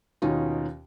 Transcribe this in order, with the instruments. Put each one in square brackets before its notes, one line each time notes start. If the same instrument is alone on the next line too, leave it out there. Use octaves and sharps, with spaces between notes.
[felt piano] D#2 B2 C#4 D#4 F4